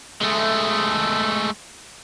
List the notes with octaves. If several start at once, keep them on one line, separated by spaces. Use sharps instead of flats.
G#3 A3